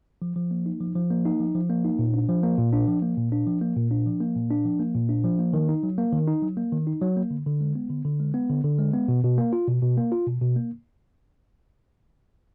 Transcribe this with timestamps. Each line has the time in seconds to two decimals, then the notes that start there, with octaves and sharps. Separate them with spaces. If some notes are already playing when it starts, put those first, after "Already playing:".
0.22 F3
0.36 F3
0.51 A#3
0.66 D#4
0.81 F3
0.96 F3
1.10 A#3
1.25 D#4
1.40 F3
1.55 F3
1.70 A#3
1.85 D#4
1.99 A#2
2.14 D4
2.29 F3
2.43 A#3
2.58 A#2
2.73 D4
2.88 F3
3.02 A#3
3.17 A#2
3.32 D4
3.47 F3
3.61 A#3
3.76 A#2
3.91 D4
4.06 F3
4.20 A#3
4.36 A#2
4.50 D4
4.65 F3
4.79 A#3
4.95 A#2
5.09 D4
5.24 F3
5.39 A#3
5.53 D#3
5.69 D#4
5.83 F#3
5.98 A#3
6.12 D#3
6.27 D#4
6.42 F#3
6.57 A#3
6.72 D#3
6.87 D#4
7.02 F#3
7.16 A#3
7.31 D3
7.46 D3
7.61 G#3
7.75 B3
7.90 D3
8.05 D3
8.20 G#3
8.34 B3
8.49 D3
8.64 D3
8.79 G#3
8.93 B3
9.08 B2
9.24 B2
9.38 A#3
9.53 F4
9.68 B2
9.82 B2
9.97 A#3
10.12 F4
10.26 B2
10.41 B2
10.56 A#3